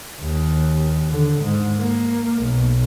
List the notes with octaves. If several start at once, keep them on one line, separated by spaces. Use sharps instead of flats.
D#2
D3
G#2
A#3
B1